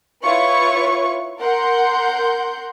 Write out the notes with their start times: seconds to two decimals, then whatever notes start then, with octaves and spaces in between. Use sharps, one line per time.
0.24 E4 F4 B4 C#5 C#6
1.39 A#4 F#5 C6 G6